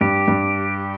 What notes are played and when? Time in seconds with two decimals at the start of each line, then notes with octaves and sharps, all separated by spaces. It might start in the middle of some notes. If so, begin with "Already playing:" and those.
0.01 G2 G4
0.28 G2